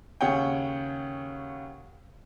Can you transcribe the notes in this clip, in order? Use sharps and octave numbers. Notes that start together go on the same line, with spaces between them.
D#2 C#3 G#4 C#5 F#5 G5